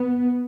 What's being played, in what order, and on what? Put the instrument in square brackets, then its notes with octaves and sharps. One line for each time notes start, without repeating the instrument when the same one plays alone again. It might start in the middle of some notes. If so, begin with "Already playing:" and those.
Already playing: [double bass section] B3